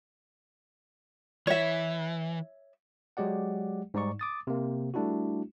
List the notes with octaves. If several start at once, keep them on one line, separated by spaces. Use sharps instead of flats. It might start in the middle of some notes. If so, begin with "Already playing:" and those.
E3 C#5 E5
F#3 G#3 G4 D5 F#5
G#2 G3 D#4 D5 C#6
D6 D#6 A6
C3 A#3
G3 A3 D4 E4 F#4